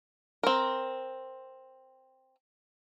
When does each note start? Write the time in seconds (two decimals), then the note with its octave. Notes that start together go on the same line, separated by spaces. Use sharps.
0.43 C4 A#4